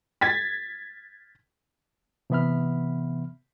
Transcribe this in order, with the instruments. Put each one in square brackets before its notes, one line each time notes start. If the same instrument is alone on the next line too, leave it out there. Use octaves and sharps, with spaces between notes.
[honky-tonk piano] G#6 A6 B6
[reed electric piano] C3 E3 B3 E5 B5 F6